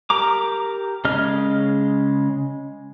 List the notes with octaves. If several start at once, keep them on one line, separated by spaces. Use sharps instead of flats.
G4 A#4 A#5 D6
C#3 G#3 D#5 F6